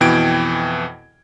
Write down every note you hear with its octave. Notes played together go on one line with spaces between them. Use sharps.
F2 B2 E3 G5 G#6 D7